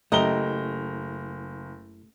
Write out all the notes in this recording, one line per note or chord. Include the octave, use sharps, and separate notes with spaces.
F#1 F#2 A3 E4 G4 D#5 A#5 G7